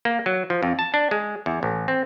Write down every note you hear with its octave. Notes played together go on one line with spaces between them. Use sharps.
A#3
F#3
F3
F2
A5
D4
G#3
E2
A1
C4